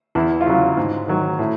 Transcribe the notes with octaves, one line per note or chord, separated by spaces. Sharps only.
E2 E4
F4
C#3 F#3 E4
G#2
D#3 F#3
A2